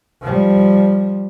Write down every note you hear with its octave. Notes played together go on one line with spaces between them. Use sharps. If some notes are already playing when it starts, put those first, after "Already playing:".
F3 G3